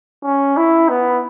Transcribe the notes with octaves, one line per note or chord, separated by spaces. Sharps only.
C#4
E4
B3